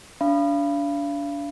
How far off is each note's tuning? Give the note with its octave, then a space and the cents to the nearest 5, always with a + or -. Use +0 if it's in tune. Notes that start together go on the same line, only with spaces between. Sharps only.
D4 -25 F5 -30 B5 -5